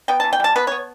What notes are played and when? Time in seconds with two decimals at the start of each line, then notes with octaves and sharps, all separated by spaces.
0.08 B3 G5
0.20 A5
0.24 E3
0.33 G5
0.40 G3 A5
0.56 B3 B4
0.67 C#5
0.72 B3